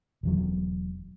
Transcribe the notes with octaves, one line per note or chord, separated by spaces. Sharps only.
E1 E2 F#3